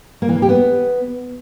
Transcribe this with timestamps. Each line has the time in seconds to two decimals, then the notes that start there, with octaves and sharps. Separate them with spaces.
0.22 A#3
0.29 E3
0.35 A#3
0.42 G4
0.49 B3